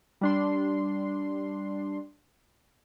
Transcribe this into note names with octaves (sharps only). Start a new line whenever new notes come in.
G3 D4 C6